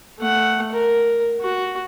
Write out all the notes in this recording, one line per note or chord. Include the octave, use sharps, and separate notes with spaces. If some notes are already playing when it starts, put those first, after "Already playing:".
A3 F#5
A#4
F#4